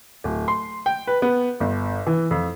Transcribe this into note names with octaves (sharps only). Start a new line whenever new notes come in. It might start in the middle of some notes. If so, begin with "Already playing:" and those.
D1
C6
G5
B4
B3
G1
E3
F2